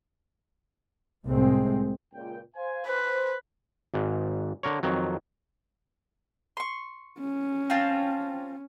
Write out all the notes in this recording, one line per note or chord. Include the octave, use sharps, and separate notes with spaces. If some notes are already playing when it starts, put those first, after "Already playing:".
C2 A2 G#3 C4
C#2 A#2 G5
C5 F5 G#5
B4 C5
G#1 G#2
D3 A#4 C#5
F2 D#3 F#3
C6 C#6
C#4
C4 F4 A5